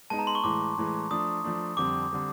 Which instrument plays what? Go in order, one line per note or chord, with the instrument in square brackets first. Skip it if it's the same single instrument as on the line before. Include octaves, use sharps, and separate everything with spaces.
[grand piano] G#3 B3 D#4 [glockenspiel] A5
[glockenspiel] A#5
C6
C#6
[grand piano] A2 E3 G#3 [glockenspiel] D6
[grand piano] A2 E3 G#3
[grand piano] F3 A3 D4 [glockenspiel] D#6
[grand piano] F3 A3 D4
[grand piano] F2 D3 G3 C4 [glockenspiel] D6
[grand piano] D3 G3 C4